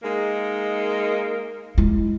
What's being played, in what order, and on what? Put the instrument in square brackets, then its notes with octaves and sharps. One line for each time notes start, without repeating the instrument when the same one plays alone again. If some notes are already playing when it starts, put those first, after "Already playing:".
[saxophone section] G#3 A#3 D#4
[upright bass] G#3 E4